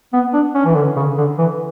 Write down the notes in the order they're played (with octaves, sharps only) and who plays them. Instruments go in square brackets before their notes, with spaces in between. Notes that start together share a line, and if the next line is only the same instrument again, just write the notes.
[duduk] B3
D4
C#4
E3
D3
C#3
D3
E3